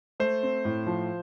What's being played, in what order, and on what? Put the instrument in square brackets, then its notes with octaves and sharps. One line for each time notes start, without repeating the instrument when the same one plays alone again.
[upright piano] A3 [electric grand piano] C5
[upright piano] C4
A2
F3